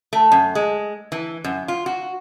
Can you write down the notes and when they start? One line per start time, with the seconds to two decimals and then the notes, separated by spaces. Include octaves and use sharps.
0.13 A3
0.32 F#2
0.55 G#3
1.12 E3
1.44 F#2
1.68 F4
1.86 F#4